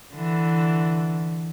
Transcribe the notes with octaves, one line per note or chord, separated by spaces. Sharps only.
D3 E3